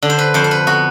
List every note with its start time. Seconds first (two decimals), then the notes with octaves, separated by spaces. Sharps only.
0.02 D3
0.10 C5
0.19 B4
0.34 F2 C5
0.44 C5
0.51 B4
0.67 B3 F#4